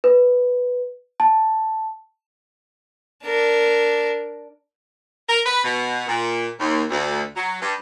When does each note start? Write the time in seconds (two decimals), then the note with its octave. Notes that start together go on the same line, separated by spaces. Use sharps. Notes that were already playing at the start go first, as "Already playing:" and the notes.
0.04 B4
1.20 A5
3.25 D4 A#4
5.28 A#4
5.46 B4
5.64 B2
6.08 A#2
6.59 D#2
6.90 D2
7.36 F#3
7.62 G2